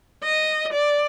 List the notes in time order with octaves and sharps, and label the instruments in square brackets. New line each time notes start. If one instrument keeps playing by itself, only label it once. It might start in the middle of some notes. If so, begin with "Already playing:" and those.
[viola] D#5
D5